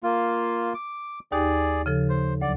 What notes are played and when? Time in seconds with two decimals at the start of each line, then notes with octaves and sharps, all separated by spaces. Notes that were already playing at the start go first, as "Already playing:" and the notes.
0.04 A#3 F4 F6
0.74 D6
1.32 D#2 D#4 G4 G#4 D5
1.86 C#3 F3 A4
2.09 C5
2.42 D2 F#3 D5